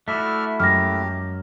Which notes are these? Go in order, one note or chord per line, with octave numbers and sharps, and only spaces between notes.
A3 E4 F#4 D5 E5 F6 A#6
F#2 F#3 G#3 G4 F6 A#6